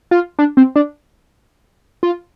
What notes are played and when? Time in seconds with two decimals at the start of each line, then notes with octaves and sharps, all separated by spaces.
0.11 F4
0.39 D4
0.57 C4
0.76 D4
2.03 F4